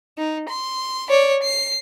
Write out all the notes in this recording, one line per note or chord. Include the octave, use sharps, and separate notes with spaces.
D#4
C6
C#5 D5
C7